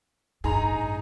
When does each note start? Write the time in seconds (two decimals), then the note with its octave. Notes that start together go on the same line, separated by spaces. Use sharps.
0.44 A1 G2 D#4 G#4 A#5